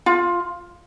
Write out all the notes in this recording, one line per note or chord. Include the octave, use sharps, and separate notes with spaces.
F4